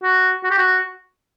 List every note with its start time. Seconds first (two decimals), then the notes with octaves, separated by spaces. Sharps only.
0.03 F#4
0.44 F#4
0.51 G4
0.58 F#4